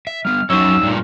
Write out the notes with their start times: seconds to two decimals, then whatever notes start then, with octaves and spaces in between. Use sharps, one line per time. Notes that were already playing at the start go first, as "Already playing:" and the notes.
0.07 E5
0.25 G3 B3 F6
0.50 F#2 F#3 D#4 C#5 E6
0.83 G2 A#2